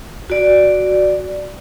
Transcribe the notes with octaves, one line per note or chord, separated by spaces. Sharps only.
F#4 D5